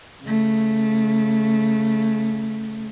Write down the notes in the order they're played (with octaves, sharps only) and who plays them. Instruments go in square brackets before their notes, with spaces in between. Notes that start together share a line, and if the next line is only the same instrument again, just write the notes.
[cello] C#3 A3